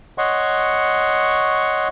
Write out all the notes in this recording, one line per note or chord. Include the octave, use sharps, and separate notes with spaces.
C#5 D#5 F#5 C6 C#6